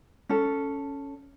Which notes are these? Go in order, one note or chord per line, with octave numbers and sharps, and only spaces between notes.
C#4 A4